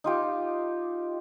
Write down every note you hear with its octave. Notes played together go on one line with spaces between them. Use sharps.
D#4 F4 G4